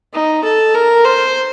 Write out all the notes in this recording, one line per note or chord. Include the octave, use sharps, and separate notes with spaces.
D#4
A4
A#4
C5